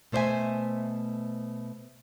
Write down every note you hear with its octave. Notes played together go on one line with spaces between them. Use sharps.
B2 A3 C5 D5 E5 G#5